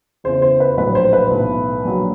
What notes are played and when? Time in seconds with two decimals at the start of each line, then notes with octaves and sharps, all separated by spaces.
0.24 E2 C#3 E3 C5
0.42 C5
0.60 B4
0.77 A#1 A2 F#3 B4
0.95 C5
1.13 B4
1.31 B1 A2 E3
1.85 A#1 A#2 F#3